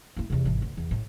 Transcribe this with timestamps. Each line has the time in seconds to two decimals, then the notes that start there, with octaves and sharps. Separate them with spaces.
0.17 A#3 E4
0.30 E2 C3
0.45 G#1 E3
0.62 D2
0.77 E2
0.91 A2